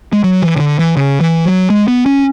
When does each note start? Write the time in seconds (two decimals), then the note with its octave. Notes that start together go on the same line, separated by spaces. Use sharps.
0.13 G#3
0.24 F#3
0.42 E3
0.56 C#3
0.60 D3
0.79 E3
0.97 C#3
1.21 E3
1.46 F#3
1.70 G#3
1.88 B3
2.06 C#4